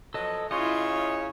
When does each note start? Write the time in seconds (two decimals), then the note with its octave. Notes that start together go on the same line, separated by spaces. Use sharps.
0.14 B2 F3 F#3 A4 D#5
0.51 C#3 E4 F4 C#5 D#5 C6